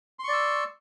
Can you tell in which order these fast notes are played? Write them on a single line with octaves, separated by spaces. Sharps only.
C6 C#6 D5 E6